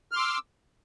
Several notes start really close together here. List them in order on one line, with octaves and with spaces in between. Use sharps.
F6 C6 D6 E6